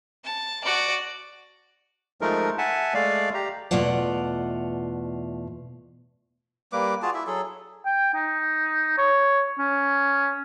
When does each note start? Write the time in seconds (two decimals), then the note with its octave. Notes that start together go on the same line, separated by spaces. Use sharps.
0.25 A5
0.64 F#4 D5
2.21 F3 G#3 A3 D#4 A#4
2.58 E5 F#5 G#5 A5
2.94 G#3 A3 D5 F5
3.34 G4 A#5
3.71 E2 B2 A3 F4 D5 F#5
6.72 G3 A#3 B4 D6
7.02 F4 F#4 G#4 A5
7.14 E4 E5
7.27 F#3 G#4 A4
7.86 G5
8.14 D#4
8.98 C#5
9.59 C#4